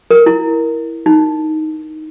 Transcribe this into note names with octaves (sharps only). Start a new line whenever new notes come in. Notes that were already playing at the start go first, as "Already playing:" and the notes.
A#4
E4
D#4